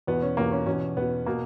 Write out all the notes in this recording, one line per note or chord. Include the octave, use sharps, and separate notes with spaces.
E2 B2 B3
C#4
E2 B2 A#3
C#4
E2 B2 C#4
E2 B2 B3
B2 A#3